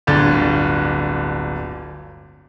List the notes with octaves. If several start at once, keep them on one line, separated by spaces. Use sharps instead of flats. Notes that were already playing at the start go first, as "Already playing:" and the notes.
D1 G1 D3 A6